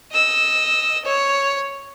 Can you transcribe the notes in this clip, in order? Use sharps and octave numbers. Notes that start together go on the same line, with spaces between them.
D#5 E6
C#5